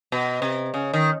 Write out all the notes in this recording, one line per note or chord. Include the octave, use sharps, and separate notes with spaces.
B2
C3
C#3
D#3